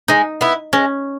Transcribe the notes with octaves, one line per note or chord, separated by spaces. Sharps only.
G#3 D#4
B3 E4
G#3 C#4